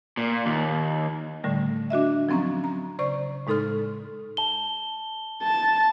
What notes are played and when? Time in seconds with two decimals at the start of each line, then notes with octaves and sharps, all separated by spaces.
0.17 A#2
0.46 D#2
1.44 A2 D3 G3 A3
1.90 D4 F#4 D#5 E5
2.29 F3 F#3 C4 C#4 A#5
2.64 A#5
2.99 C#3 C5 D5 C#6
3.47 A2 G#3 D#4 A4 C6 F6
4.37 A5 G7
5.43 A5